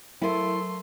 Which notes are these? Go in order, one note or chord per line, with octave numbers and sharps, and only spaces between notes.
F#3 A3 E4 A#4 C6